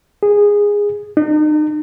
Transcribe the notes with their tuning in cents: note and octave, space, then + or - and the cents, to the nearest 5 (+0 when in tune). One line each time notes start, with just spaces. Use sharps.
G#4 -15
D#4 -40